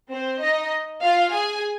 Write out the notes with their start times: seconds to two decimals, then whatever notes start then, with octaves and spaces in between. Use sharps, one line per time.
0.10 C4 C5
0.41 D#4 D#5
1.02 F4 F5
1.32 G#4 G#5